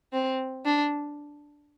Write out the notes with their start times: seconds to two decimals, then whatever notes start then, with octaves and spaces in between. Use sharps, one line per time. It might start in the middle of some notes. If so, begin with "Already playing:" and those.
0.13 C4
0.65 D4